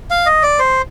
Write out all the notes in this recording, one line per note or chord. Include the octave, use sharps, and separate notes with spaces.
F5
D#5
D5
C5